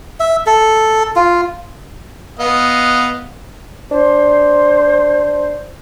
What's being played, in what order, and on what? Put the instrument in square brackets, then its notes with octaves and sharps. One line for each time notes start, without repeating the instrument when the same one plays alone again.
[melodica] E5
A4
F4
[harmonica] B3 D#5 F5
[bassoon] D4 [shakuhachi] C5